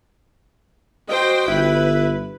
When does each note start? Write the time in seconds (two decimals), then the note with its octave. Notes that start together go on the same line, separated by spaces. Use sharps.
1.09 F#4 C5 D#5 G5
1.48 G1 E4 B4